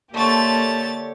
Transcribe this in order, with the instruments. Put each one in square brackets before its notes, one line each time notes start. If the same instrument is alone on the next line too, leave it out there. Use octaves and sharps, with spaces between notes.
[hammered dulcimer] D3 C6 C#6 [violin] A3 A6 [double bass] A#3 [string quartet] G4 C#5